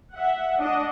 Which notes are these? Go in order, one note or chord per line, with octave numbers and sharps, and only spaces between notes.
E5 F#5
D4 D#5 F#5